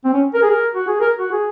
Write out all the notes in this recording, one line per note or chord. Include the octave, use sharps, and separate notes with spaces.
C4
C#4
A#4
G#4
A#4
F#4
G#4
A#4
F#4
G#4